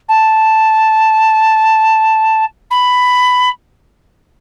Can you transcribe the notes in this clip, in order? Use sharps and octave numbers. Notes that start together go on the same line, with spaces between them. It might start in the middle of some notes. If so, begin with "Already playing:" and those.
A5
B5